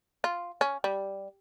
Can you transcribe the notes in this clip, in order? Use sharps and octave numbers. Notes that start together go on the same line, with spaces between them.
F4
C#4
G3